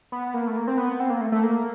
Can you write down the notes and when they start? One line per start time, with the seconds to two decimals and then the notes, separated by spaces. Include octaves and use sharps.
0.12 B3
0.34 A#3
0.47 A3
0.57 A#3
0.68 C4
0.78 B3
1.00 C4
1.10 A#3
1.21 A3
1.32 A3
1.43 A#3